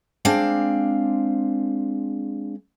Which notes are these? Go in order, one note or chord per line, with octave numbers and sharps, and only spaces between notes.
G#3 C4 D4 F5